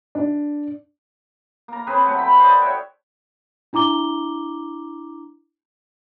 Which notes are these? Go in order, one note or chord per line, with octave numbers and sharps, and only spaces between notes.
D4
A#3 A#5
C4 G#4 B4 C#5
F#3 A3 F#5
G5 B5
C5 D5 D#5
F#4 C#5 E5 G5
D4 E4 A#5 D6 G7